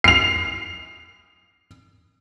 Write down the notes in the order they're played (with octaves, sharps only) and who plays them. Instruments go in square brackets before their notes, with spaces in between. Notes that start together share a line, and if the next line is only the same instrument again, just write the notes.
[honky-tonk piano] C7 F7